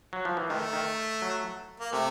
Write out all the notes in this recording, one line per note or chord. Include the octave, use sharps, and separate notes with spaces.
F#3
F3
E3
D#3 A3
D#3
F#3
A#3
C3 A3